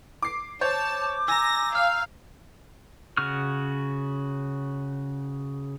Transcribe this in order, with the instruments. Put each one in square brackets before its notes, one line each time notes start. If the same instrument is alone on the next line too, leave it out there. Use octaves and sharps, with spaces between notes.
[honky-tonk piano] D6 C7
[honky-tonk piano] C5 C#5 [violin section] A5 [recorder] D6 [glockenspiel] G6
[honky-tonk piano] G#5 [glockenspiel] A#5 E6 [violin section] A#6
[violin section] F5 [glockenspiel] F6
[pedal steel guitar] C#3 F#4 C#6 F6